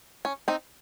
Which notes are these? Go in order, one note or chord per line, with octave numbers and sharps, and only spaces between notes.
C#4
C4 D#4